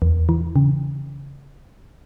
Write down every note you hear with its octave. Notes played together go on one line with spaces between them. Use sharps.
E2
E3
C#3